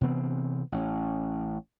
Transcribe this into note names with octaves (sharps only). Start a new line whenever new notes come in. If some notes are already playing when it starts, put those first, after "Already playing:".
C3 E3 B3 C4
A1 C#4